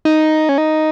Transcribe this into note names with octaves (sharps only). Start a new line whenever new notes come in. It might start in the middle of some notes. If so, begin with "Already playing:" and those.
D#4
C#4
D#4